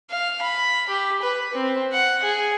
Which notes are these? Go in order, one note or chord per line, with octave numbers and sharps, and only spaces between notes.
F5
B5
G4
B4
C4
F#5
G#4